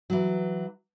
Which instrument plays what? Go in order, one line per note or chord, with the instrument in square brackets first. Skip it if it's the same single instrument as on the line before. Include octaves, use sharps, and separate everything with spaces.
[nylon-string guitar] E3 F#3